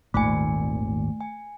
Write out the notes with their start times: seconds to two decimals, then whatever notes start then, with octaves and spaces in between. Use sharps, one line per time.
0.14 G#1 D#2 A#2 A3 G#5
1.21 G#5